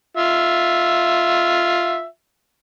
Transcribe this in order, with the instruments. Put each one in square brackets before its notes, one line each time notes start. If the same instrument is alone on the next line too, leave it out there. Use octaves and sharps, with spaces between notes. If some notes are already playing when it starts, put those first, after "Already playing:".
[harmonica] F4 E5